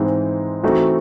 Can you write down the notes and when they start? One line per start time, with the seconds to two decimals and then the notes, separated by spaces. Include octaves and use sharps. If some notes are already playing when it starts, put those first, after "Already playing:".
Already playing: G#2 E3 G#3 C4 D#4
0.63 E3 A3 C4 D#4 F#4